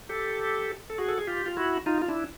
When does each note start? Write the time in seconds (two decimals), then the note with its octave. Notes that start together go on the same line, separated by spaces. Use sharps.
0.09 G4 A4
0.90 A4
0.98 F#4 G#4
1.08 A4
1.18 G#4
1.27 F4 G4
1.46 F4
1.57 E4 F#4
1.86 D#4 F4
2.02 F4
2.08 D4 E4